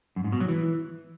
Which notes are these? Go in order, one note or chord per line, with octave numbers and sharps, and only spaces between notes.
F#2
G#2
B2
F#3
E3